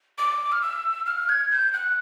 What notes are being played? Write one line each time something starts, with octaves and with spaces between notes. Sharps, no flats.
D6
F6
E6
F6
G#6
G6
F#6